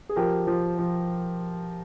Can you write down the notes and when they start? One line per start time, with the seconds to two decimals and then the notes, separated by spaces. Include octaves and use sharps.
0.09 G#4
0.16 F3 G4 A#4
0.47 F3
0.79 F3